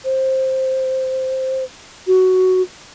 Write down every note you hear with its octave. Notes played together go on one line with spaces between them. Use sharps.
C5
F#4